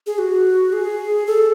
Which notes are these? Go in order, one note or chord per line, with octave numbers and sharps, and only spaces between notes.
G#4
F#4
G#4
A4